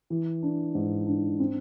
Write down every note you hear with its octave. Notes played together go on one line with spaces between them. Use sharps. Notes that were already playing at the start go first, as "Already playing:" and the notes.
E3
D4
G#2
D4
C4